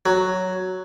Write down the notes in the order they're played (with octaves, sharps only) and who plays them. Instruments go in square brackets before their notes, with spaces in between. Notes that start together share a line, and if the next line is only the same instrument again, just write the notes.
[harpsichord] F#3